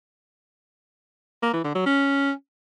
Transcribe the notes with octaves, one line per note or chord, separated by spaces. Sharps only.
A#3
E3
D3
F#3
C#4